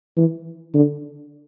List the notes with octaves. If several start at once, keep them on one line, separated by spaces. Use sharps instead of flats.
E3
D3